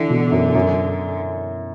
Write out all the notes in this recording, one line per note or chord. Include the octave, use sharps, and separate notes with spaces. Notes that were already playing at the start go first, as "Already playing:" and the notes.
Already playing: D3 E3
B2
F#2
F#2